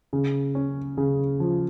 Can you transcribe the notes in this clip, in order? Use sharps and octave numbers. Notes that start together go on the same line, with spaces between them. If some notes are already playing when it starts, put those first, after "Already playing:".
C#3
C#4
C#3
F3